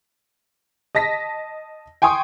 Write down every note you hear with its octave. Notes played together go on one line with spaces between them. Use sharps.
D#5 A5 A#6 B6
G5 G#5 C6 C#6 D#6